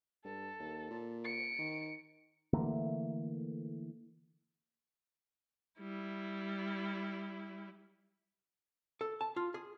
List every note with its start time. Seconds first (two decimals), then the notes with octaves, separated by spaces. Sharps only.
0.25 G2 A4
0.59 D#2
0.90 A#2
1.24 C#7 D7
1.58 D#3
2.53 D3 E3 A3 A#3
5.80 G3 E4
9.01 A4
9.21 A5
9.36 F4
9.54 G#4